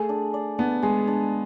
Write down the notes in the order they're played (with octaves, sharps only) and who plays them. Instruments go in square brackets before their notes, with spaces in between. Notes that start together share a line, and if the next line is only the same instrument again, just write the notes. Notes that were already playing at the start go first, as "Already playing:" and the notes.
Already playing: [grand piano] A3 [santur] G#4
[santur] D4
D5
[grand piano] B3 [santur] D4
[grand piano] G#3 [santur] G#4
[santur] D4